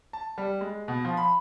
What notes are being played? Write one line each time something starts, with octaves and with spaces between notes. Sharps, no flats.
A5
G3
G#3
B2
F3
B5